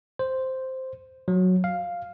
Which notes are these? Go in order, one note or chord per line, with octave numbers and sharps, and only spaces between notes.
C5
F#3
F5